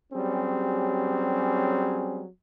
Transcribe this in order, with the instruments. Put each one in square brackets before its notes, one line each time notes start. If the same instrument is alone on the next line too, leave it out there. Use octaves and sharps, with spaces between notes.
[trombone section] F#3 G3 C4 C#4 G4 G#4